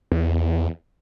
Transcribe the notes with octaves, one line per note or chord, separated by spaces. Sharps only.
E2